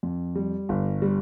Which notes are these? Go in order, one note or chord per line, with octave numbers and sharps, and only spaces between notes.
F2
G3
G1
G3